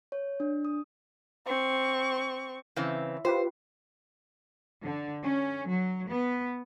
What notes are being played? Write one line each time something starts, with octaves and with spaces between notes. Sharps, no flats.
C#5
D4
D#6
C4 C#6
C#3 E3 C4
F4 G4 B4 C5
D3
C#4
F#3
B3